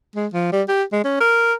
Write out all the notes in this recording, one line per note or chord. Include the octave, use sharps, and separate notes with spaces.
G#3
F3
G3
G4
G#3
C#4
A#4